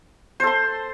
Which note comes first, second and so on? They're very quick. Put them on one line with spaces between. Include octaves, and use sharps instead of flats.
C5 A4 C6